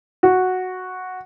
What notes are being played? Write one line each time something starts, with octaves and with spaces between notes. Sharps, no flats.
F#4